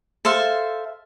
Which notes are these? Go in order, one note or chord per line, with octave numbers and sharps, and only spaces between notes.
A4 C5 E5 F5